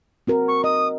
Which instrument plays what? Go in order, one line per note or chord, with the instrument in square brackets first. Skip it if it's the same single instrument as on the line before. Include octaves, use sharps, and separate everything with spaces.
[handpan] C4 F#4 A#4
[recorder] C#6
[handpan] D#5 [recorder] D#6